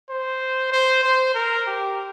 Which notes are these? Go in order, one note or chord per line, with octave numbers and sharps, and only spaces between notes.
C5
C5
C5
A#4
G4